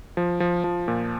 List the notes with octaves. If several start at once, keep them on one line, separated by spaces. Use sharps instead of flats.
F3
F3
F3
A#2